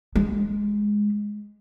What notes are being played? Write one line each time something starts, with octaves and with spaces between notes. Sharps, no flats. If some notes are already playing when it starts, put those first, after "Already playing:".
G#3